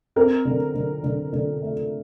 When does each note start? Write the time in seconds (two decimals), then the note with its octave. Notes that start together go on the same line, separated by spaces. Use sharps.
0.16 C4 A#4
0.45 D3
0.74 D3
1.03 D3
1.33 D3
1.62 A3